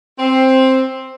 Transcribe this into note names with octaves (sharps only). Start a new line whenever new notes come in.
C4